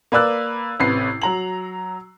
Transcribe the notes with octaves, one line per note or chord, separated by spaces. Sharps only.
A#3 B4 D5 E6 F#6
A1 C3 B4 C7
F#3 A#5 F#7